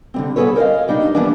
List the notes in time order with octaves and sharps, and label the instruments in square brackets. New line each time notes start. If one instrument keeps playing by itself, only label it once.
[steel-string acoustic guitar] D3 G3 C4
G3 B3 G#4 A4 B4 C#5
A#4 C5 D5 D#5 F5
G2 G3 D4 D#4
E3 F3 G3 A#3 B3 D4